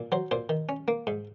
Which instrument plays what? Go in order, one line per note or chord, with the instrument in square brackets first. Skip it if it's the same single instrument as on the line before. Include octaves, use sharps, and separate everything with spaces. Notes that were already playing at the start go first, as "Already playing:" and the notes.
Already playing: [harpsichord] A#2
F#3 C5
A#2 C5
D#3
C#4
A#3
G#2